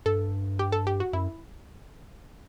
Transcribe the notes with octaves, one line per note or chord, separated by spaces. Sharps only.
G2 A4
G4
A4
G4
F#4
F#2 E4